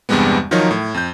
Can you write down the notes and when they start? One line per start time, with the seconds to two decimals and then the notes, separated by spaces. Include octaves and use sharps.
0.09 E2 G2 C3 G3 G#3 B3
0.51 D#3 F3 F#3 D#4 A#4 C#5
0.71 A2
0.94 F2 G6